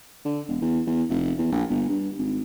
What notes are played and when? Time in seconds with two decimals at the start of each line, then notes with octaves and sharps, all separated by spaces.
0.25 D3
0.49 E1
0.61 E2
0.87 E2
1.10 F1
1.38 E2
1.52 A#1
1.70 G1
1.89 G2
2.19 G#1